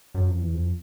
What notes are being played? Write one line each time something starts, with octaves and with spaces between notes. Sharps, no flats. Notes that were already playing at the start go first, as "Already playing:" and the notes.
F#2
F2
E2
F2